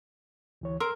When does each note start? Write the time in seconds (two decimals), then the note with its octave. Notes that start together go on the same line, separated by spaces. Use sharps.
0.61 D2 E3 C#5
0.80 A#4 C6 E6